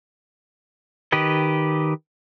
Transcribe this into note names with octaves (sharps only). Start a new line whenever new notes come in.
D#3 G4 B4 D#5